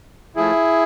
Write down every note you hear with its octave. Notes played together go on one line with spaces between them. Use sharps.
F3 A3 E4 G#4